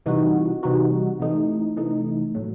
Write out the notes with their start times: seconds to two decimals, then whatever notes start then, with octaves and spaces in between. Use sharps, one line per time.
0.06 C3 E3 G3 D#4 F#4
0.63 C3 E3 G3 D#4 F#4
1.20 C3 E3 A3 D#4
1.77 C3 E3 A3 D#4
2.35 A2 F#3 A3